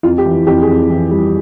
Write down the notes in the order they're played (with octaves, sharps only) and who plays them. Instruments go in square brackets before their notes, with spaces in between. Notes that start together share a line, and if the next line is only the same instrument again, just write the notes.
[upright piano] F2 F4
G4
E3
F2 G4
G#4
F2
E3
G3